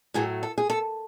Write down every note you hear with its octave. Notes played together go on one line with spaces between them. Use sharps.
A2 F#3 A3 G#4
A4
G#4
A4